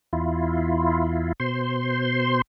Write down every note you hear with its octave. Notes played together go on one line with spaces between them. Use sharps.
E2 E4 F4
B2 C5 C6